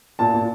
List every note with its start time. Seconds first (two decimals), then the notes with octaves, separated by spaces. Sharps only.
0.19 A#2 A5
0.34 A#2